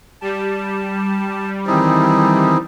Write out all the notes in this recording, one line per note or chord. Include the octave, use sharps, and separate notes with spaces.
G3 A5
D#3 E3 C4 D#4 E4 G#4